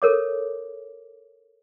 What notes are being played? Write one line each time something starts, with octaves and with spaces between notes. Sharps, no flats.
A4 A#4 C#5 D6